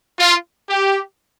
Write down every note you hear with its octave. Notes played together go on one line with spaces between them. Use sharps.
F4
G4